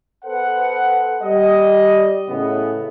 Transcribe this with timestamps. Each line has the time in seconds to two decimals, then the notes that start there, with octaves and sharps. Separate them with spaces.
0.25 B3 A4 B4 C5 F#5
1.23 G3 D#5
2.29 A2 C#3 B3